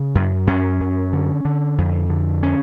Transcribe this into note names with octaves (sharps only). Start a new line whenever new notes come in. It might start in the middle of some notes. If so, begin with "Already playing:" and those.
Already playing: C#3
F#2
F#2 C#4
F#2
D3
D3
F2
D3
C#4